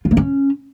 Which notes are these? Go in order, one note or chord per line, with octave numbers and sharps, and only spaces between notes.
F4
A#3
C#4